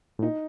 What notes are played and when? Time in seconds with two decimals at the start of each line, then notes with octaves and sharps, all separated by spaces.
0.19 A2
0.22 A#2 D#4